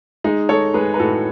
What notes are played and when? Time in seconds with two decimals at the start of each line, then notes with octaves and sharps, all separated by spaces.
0.24 G#3 D#4
0.49 G#3 A4 C#5
0.74 G#3 G#4 B4
0.94 B4
0.99 A2 F#4 A4